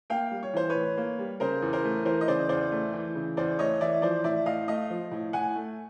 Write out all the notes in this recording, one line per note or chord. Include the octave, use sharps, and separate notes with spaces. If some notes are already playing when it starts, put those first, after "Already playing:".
A#3 F5 G5
G3
C#5
E3 C5
B4 C#5
A2
A#3
G3
C#3 A#4 C5
E2
A#4 C5
A3
E3 A#4 C5
D#5
C#3 C5 D5
E2 C5 D5
A3
E3
C#3
E2 C5 D5
A3 C#5 D#5
E3 D5 E5
F3 C5 D5
A2 D5 E5
A2 D#5 F5
A3 D#5 F5
F3
A2
A2 F#5 G#5
A3